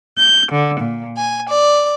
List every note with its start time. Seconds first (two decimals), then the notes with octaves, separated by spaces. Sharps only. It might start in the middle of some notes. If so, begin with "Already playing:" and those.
0.19 G6
0.51 D3
0.82 A#2
1.16 G#5
1.48 D5